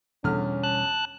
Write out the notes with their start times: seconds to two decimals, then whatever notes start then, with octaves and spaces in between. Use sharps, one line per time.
0.24 E2 B2 D3 G3 C#4 F6
0.63 A5 F#6